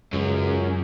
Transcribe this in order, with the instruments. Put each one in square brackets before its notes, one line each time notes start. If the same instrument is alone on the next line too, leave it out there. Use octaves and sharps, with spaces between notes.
[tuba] C#2 [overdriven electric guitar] F#2